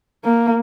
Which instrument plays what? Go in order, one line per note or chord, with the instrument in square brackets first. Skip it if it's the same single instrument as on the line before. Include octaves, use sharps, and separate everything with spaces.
[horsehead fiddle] A#3